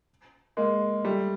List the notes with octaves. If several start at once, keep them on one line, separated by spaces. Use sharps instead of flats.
G#3 A#3
G3 A3